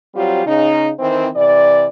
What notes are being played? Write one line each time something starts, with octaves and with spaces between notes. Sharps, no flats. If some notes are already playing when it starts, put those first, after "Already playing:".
F#3 G3 C4 F4 G4
C#3 D#4
D#3 E3 C4
C3 E3 D5